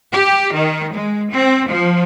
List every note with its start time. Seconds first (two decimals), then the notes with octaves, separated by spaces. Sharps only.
0.12 G4
0.53 D#3
0.94 G#3
1.31 C4
1.68 F3